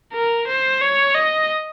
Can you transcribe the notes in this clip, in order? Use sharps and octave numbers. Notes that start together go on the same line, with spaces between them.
A#4
C5
C#5
D#5